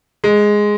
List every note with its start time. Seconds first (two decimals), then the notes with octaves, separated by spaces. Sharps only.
0.24 G#3